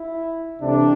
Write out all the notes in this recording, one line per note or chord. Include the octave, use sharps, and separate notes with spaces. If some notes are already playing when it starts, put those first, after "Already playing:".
Already playing: E4
C2 C3 E3 A3 D4